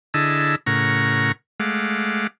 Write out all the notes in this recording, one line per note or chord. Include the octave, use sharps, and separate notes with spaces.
D3 E4 G#4 D#5 A5 E6
A2 C#3 A#4 F#5 A#5 C#6
G#3 A3 F5 F#5 D6